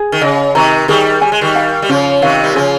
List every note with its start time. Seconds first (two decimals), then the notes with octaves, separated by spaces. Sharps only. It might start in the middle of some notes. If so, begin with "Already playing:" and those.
Already playing: G#4
0.12 D#3
0.21 C#3 D#5
0.55 C3 D#3 A#5
0.88 D#3 G3 G#4
1.21 G3 G#5
1.32 G#3
1.41 D#3 G3
1.55 F5
1.82 G3
1.89 C#3 F3 C#4
2.22 C3 D#3 F5
2.44 G3
2.55 C#3 F3 G#4